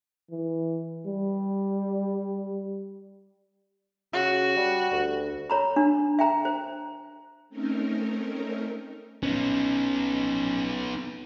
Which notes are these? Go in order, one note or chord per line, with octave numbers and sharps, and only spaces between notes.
E3
G3
C#3 F#4
G3
D2
C#5 A#5 B5
D4
E5 G5 A#5
C5
A3 C4 C#4 D#4 A#4
B3 C#4 D#4